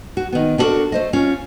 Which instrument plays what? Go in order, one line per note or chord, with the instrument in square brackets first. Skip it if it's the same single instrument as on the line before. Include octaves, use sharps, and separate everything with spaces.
[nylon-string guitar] F#4
D#3 B3
B3 D4 F#4 G4 A4 A#4
A3 C5 D#5
C#4 F4